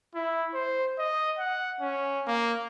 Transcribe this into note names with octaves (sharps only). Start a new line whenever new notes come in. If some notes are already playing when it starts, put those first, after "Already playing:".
E4
C5
D#5
F#5
C#4
A#3